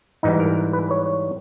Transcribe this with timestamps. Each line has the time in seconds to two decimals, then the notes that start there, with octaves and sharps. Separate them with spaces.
0.23 G#2 E3 G3 D#4
0.40 A#4
0.73 B4
0.91 C#5